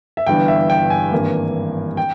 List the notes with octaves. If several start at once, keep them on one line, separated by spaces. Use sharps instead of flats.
E5
G1 G2 E3 G5
E5
G5
G#5
G#1 G2 E3 A#3
G5